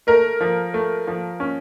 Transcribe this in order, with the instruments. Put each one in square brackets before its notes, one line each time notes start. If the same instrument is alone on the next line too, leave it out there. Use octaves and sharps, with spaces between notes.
[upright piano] A3 A#4
F3
A3
F3
C#4